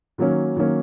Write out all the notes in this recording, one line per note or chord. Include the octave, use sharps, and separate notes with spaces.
D#3 F#3 A#3 C#4
D#3 F#3 A#3 C#4